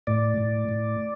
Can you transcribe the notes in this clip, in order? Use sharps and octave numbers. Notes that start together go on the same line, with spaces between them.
A2 D5
A2
A2